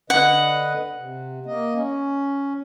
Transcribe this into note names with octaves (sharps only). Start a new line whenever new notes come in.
D3 B4 D#5 F#5
C3
A#3 D#5
C#4